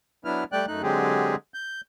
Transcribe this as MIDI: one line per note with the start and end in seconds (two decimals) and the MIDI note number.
0.25 0.44 54
0.25 0.44 59
0.25 0.44 62
0.25 0.44 64
0.25 0.44 71
0.25 0.44 89
0.52 0.66 55
0.52 0.66 57
0.52 0.66 74
0.52 0.66 79
0.52 0.66 90
0.68 0.82 42
0.68 0.82 57
0.68 0.82 63
0.68 0.82 90
0.82 1.35 50
0.82 1.35 54
0.82 1.35 56
0.82 1.35 60
0.82 1.35 67
0.82 1.35 68
1.54 1.81 91